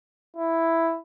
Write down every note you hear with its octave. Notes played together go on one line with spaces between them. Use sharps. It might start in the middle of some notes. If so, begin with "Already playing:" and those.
E4